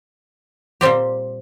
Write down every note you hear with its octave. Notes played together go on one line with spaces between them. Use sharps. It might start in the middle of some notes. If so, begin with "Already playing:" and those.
A#2 G3 C4 G4